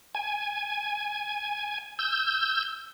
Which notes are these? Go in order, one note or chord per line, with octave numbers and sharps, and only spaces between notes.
G#5
E6 G6